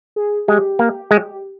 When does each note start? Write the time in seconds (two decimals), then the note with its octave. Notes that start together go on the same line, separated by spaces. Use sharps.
0.16 G#4
0.48 G#3 G4
0.79 A#3
1.11 G#3